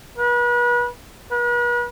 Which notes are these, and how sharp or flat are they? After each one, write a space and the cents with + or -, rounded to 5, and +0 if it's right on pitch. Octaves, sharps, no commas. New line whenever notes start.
B4 -35
B4 -40